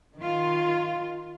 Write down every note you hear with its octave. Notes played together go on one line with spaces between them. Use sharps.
D#3 F4